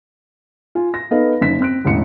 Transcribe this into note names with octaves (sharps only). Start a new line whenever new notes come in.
F4 G#5
A#6
B3 D#4 A4 B4 D#5 F5
F#1 C#4 D#4 B6
C4 F#6 D7
E1 A1 C#7